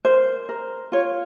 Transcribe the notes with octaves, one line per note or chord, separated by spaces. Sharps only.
A#4 C5
A#4
F4 C#5